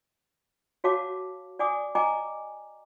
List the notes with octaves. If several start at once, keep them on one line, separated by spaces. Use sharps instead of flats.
F#4 C#5 F5 F#5 A5 D6
D5 F#5 G#5 D6 D#6
D#5 G5 G#5 A#5 D6